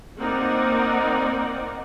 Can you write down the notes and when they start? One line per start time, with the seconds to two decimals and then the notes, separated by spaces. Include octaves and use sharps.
0.19 A#3 C4 D#4 A#4 D5 F#5